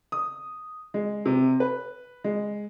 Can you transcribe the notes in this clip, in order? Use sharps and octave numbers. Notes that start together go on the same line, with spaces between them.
D#6
G#3
C3
B4
G#3